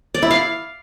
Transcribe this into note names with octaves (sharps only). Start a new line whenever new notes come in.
D5
E4
F5